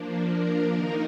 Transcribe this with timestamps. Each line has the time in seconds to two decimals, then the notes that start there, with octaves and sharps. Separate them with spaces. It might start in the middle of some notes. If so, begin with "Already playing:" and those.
Already playing: F3 A#3 D4
0.28 A#4
0.73 D#3 A#3 D#4 A#4